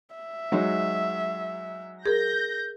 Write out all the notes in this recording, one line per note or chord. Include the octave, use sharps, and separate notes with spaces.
E5
F#3 G#3 D#4
G#4 A#4 G6 A#6